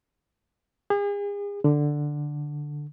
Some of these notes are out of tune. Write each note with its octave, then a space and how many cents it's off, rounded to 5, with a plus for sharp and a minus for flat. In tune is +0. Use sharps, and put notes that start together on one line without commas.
G#4 -40
D3 +5